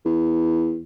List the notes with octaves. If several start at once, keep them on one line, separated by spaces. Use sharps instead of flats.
E2